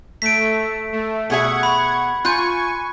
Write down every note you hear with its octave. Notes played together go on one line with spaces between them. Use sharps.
A3 B6 D7
A3
B2 G#4 E5 F#5 C#6 G#6
B5
F4 G#5 C#6 F#6 G6